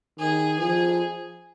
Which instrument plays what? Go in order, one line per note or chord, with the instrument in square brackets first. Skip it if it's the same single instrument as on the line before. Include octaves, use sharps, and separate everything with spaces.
[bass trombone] D#3 [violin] G#4
[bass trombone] F3 [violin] G#4